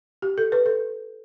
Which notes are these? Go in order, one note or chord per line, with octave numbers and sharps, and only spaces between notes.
G4
A4
B4
A4